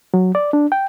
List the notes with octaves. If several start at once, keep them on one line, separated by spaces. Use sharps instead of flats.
F#3
D5
D4
G5